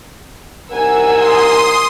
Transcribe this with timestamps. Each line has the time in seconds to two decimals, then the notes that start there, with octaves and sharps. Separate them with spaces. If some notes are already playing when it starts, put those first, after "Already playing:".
0.71 C2 D#4 A#4 F#5 G#5 E6
1.15 C6 D#6